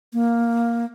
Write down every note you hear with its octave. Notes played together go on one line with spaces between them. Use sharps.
A#3